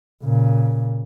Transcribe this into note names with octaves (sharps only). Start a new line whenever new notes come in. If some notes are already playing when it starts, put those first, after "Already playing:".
A#2 C#3